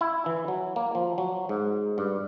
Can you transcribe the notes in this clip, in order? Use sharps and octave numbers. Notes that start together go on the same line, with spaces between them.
E4
E3
F#3
A#3
F3
F#3
G#2
G2